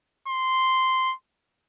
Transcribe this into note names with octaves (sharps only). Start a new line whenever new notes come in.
C6